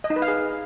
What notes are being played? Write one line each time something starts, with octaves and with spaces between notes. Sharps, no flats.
D#5
D#4
B4
F5
G#4